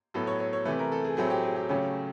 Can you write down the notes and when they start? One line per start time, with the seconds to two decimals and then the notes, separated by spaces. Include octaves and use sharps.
0.14 A2 F#3 B3 A4
0.27 C#5
0.40 C#5
0.53 C#5
0.65 C3 E3 A3 B4
0.79 A#4
0.92 A4
1.04 G#4
1.17 A2 F#3 A3 C4 G#4
1.30 G4
1.43 G#4
1.56 G4
1.69 C#3 F#3 A3 C#4 G4